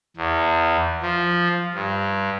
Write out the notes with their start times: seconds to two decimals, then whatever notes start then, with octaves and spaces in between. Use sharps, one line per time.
0.17 E2
1.02 F3
1.74 G2